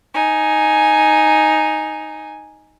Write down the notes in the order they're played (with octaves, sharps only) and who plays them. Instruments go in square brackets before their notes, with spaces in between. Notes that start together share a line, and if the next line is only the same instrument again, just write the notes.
[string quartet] D#4 G#5